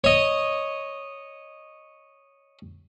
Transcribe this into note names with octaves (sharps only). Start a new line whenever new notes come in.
C#5 D#5